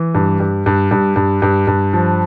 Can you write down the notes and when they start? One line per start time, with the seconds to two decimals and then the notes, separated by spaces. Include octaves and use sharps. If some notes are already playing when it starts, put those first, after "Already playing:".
Already playing: E3
0.15 G2
0.40 G2
0.66 G2
0.91 G2
1.16 G2
1.42 G2
1.67 G2
1.93 F3